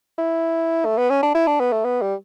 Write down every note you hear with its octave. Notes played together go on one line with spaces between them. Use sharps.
E4
A3
B3
C#4
D4
E4
D4
B3
A3
B3
G3